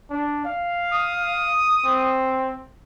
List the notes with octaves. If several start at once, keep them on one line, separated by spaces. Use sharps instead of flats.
D4
F5
D#6
C4